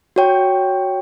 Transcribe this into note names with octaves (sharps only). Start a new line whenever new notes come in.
F#4 C#5 G5